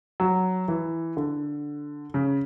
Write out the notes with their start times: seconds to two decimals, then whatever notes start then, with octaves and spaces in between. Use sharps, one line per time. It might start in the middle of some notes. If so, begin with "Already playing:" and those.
0.20 F#3
0.68 E3
1.17 D3
2.14 C#3